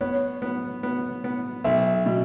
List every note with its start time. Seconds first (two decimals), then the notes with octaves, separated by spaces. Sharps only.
0.01 B3 C#5
0.42 B3
0.83 B3
1.24 B3
1.64 B1 E5
2.06 B2